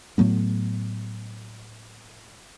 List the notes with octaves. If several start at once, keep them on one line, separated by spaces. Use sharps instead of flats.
A2 F#3 A3 B3